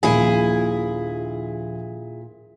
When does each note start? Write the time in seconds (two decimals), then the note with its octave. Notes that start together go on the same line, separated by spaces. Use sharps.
0.03 D#1 A#1 A#2 E4 G#4 B5